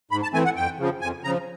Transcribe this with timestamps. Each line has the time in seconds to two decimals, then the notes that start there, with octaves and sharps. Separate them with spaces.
0.11 G#2 B5
0.23 A5
0.33 E3 A3 C4 G#5
0.45 F#5
0.56 F2 G5
0.79 C#3 F3
1.01 F2 G#5
1.24 C#3 A#5
1.27 F3